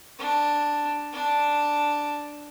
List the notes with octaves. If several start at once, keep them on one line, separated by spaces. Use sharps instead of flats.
D4
D4